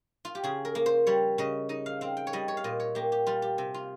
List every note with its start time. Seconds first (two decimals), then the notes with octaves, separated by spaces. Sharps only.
0.25 F4
0.35 G4
0.44 C#3 G#4
0.65 A#4
0.75 A#3
0.86 C5
1.07 G3 C#5
1.38 C#3 D#5
1.69 D#4 D#5
1.86 F5
2.01 C4 F5
2.17 G5
2.27 C#5
2.33 G3 D#5
2.48 C#5
2.57 F5
2.64 A#2 D#5
2.80 C#5
2.95 A#3 G4
3.12 G4
3.27 G3 F4
3.42 G4
3.58 C3
3.74 F4